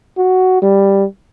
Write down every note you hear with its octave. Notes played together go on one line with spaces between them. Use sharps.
F#4
G3